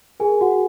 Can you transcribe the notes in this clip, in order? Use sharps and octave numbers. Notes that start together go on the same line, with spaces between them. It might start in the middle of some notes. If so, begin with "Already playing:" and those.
G#4 A#4 G#5
F#4 F#5